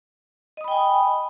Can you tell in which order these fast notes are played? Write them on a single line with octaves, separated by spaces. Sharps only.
D#5 D#6 B5 G5 G#5